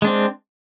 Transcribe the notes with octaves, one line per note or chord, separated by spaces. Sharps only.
G#3 C4 D4